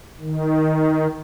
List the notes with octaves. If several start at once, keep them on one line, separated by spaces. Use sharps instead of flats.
D#3